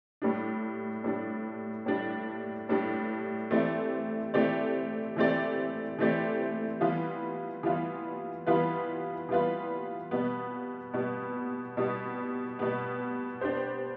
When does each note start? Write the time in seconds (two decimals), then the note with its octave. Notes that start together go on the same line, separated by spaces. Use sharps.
0.22 A2 G3 D4
1.04 A2 G3 D4
1.86 A2 G3 D4
2.69 A2 G3 D4
3.51 E3 A3 C4 G4 D5
4.34 E3 A3 C4 G4 D5
5.16 E3 A3 C4 G4 D5
5.99 E3 A3 C4 G4 D5
6.81 E3 G3 B3 F4 B4
7.63 E3 G3 B3 F4 B4
8.46 E3 G3 B3 F4 B4
9.29 E3 G3 B3 F4 B4
10.11 B2 G3 B3
10.93 B2 G3 B3
11.77 B2 G3 B3
12.59 B2 G3 B3
13.41 B3 D4 G4 C5